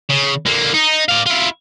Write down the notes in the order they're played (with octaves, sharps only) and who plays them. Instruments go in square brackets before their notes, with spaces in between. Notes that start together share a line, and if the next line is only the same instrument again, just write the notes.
[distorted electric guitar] C#3
D3 A#3
D#4
D5 F5
E4 F4